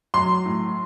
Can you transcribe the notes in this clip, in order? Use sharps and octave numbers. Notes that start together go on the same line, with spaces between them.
F#3 C6
A2